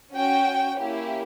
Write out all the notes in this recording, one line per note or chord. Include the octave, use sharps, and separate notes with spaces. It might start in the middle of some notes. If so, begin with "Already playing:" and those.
C#4 F#4 G5
A#3 C#4 E4 G4